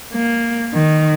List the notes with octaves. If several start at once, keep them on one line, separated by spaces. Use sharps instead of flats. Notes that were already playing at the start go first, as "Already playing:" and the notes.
A#3
D#3